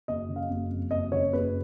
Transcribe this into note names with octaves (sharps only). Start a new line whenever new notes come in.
F#1 D#5
C#3
F5
F#1
F2
F#1 D#5
C#3 C#5
F#1 B4